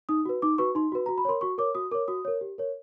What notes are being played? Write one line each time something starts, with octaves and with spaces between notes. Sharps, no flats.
D#4 D#6
F#4 B4
D#4 D6
F#4 B4 C#6
D#4 C6
F#4 B4
F#4 A#5
B5
A#4 C#5 C6
F#4 C#6
A#4 C#5 D6
F#4 D#6
A#4 C#5 D6
F#4 D#6
A#4 C#5
G4
A#4 C#5